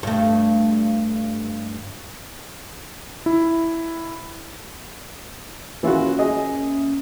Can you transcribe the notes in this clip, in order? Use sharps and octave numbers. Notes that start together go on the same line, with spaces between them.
G2 A3
E4
E3 A#3 C#4 F4 F#4 E5
G#4 D#5